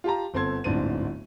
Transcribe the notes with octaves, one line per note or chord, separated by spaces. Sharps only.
F4 G4 A5 A#5
G1 C4 A4 C6 G#6
D1 G1 G#2 C4 D4 D#7